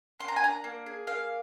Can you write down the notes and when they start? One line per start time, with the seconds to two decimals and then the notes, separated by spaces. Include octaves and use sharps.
0.20 A#3 C6
0.28 A#5
0.36 G#5
0.42 D4 A#5
0.64 A#3
0.86 G#4
1.07 A#3 F5